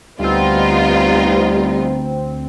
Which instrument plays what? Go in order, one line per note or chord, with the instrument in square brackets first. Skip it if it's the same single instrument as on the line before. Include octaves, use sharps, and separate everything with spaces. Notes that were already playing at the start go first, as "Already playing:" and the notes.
[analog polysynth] D2 C4 [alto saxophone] G3 [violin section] B3 D#4 F4